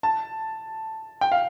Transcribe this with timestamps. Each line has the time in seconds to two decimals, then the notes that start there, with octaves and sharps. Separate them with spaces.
0.03 A5
1.21 G5
1.32 F5